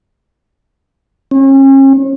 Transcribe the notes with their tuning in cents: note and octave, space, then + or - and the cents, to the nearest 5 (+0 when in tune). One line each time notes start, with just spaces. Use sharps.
C#4 -40